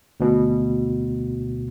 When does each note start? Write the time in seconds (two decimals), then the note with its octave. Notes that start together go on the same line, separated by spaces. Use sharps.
0.20 D2 B2